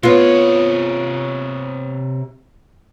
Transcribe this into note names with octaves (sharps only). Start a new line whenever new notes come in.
C3 B3 F4 C#5